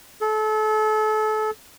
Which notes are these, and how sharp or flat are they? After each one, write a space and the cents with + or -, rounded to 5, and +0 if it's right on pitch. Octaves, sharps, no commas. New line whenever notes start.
A4 -30